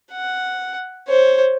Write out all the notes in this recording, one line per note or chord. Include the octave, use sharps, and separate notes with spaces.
F#5
C5 C#5